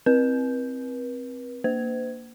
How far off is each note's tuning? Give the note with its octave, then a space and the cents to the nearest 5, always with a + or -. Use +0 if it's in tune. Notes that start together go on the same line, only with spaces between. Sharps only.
C4 +0 B4 -40
A#3 +0 C5 -40